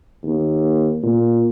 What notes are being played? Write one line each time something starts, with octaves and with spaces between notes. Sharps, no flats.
D#2
A#2